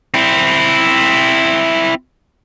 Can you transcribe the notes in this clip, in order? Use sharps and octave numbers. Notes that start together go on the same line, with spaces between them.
C4 E4